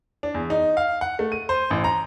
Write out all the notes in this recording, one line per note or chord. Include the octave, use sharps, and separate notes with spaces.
D4
E2
D#4
F5
F#5
A3
D#7
C5
A1
A#5